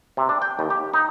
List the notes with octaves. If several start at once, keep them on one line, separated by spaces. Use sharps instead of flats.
C3
D4
G5
D#2
G4
D#4